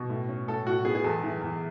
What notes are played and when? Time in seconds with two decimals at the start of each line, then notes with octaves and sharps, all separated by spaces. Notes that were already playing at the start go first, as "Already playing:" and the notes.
Already playing: B2
0.10 A2
0.29 C#4
0.48 A2 A4
0.66 A2 F#4
0.85 B3 G#4
0.95 G#4
1.04 E2 A4
1.23 E3
1.41 E2